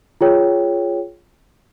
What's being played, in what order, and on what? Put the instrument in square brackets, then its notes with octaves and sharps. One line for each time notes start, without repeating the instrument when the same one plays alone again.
[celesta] F4 G#4 C#5 G5